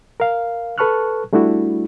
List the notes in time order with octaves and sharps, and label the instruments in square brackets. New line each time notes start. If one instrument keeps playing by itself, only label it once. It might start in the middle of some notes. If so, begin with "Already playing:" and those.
[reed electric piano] A#4 F5
A4 B4 A5 C#6 F6 F#6
G3 A3 D4 E4 F#4